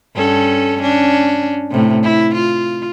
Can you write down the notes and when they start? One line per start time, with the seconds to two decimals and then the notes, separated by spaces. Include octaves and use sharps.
0.16 G2 C#4 A4
0.81 C#4 D4
1.71 A2 C3
2.03 E4
2.35 F4